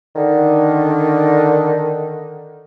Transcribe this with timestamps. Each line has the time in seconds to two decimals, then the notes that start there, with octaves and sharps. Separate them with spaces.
0.15 D3 D#3